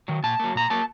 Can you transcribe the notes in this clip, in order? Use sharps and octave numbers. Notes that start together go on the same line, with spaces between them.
D#3 F#3
A#2 A5
F#3 A#3
A#2 A#5
F#3 A#3 A5